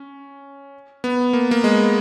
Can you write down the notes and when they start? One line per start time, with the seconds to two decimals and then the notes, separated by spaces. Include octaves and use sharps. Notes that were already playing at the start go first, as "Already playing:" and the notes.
Already playing: C#4
1.04 B3
1.33 A#3
1.51 A#3
1.64 G#3